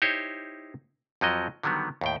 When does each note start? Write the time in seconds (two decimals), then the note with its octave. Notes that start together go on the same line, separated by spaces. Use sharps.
0.02 D#4 E4 G4 C5 C#5
1.21 F2 F3 F#3 D#5
1.63 D3 D#3 F#3 G3 B3
2.01 D#2 A2 G5